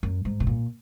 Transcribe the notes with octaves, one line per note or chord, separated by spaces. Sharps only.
F#2
G#2
B2
A#2